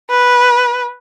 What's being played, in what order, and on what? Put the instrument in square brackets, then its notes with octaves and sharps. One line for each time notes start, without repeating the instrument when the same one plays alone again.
[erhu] B4